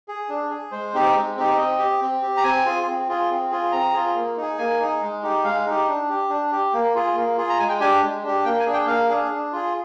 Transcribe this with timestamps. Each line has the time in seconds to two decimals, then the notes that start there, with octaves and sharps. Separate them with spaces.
0.08 G#4
0.29 D4
0.50 G#4
0.71 G#3 C5
0.94 C4 D#4 G4
1.15 G#3
1.37 C4 D#4 G4
1.58 C4 D#5
1.79 G4
2.01 C4
2.22 G4
2.37 A#5
2.43 C4 G#5
2.66 F4 G#4
2.86 C4
3.09 F4 G#4
3.30 C4
3.51 F4 G#4
3.72 C4 A#5
3.93 F4 G#4
4.15 A#3
4.37 D#4 G#4
4.58 A#3 G#5
4.80 D#4 G#4
5.02 G#3
5.23 D#4 G4
5.44 G#3 F5
5.66 D#4 G4
5.88 D4
6.09 G4
6.29 D4
6.52 G4
6.74 A#3
6.95 F4 G#4
7.15 A#3
7.37 F4 G#4
7.50 A#5
7.59 G#3 G#5
7.69 G5
7.80 D4 G4 G#5
8.02 G#3
8.23 D4 G4
8.45 A#3 G5
8.60 G#5
8.66 D4 G#4
8.73 G5
8.87 A#3 F5
9.08 D4 G#4
9.31 D4
9.52 F4 G#4